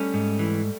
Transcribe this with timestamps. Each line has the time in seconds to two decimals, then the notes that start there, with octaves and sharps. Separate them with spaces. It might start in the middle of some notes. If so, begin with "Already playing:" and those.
Already playing: G3 A3 C#4
0.14 G#2
0.39 E3